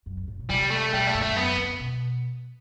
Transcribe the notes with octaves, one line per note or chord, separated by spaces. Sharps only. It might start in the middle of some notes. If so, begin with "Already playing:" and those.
F#2
G2
A2
B2
C3 G3
A3
B2 G3
A3
G2
A3
G2
F#2 B3
D3
B2